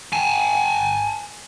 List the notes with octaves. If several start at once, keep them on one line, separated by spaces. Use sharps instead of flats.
G#5 A5